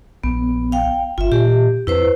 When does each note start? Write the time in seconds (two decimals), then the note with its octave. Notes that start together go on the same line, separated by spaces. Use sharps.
0.24 A#1 B3
0.72 F5 G5
1.18 G1 F4 E5
1.32 A#2 G4
1.87 F2 E4 B4 C5